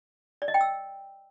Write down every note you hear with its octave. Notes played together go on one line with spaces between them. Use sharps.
D5
D#5
G5
E6